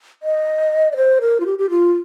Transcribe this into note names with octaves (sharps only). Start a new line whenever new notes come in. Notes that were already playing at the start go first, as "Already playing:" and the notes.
D#5
D5
C5
A#4
F4
G4
G4
F4